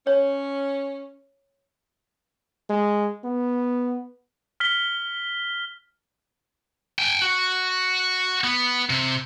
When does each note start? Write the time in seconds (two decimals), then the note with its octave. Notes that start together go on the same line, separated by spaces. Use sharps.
0.07 C#4 C#5
2.70 G#3
3.25 B3
4.60 F6 B6 G7
6.99 G5 G#5
7.22 F#4
8.44 B3
8.90 C3